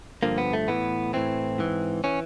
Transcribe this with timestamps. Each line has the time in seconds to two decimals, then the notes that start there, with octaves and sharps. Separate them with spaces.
0.23 G2 D3 F3 A#3
0.38 B3
0.53 A3
0.68 A2 E3 B3
1.13 A2 E3 C4
1.58 G#2 E3
2.04 E3 C#4